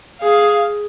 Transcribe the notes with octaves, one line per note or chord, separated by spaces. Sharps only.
G#4 F5